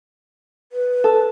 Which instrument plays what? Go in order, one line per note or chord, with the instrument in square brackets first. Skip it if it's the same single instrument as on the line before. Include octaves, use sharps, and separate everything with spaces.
[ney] B4
[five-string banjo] A4